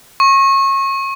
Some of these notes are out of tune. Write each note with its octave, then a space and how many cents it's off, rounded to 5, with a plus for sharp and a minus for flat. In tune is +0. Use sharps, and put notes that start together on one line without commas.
C#6 -30